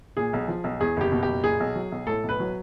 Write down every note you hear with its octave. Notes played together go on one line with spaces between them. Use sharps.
A#2 G#4
B1
F3
B1
E2 G#4
F#1 G4
B2
G4
F#1
A#2 G#4
B1
F#3
B1
A2 A4
B1
B4
F#3